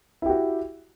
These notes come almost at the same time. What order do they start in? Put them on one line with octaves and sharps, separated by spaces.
E4 G4 F#4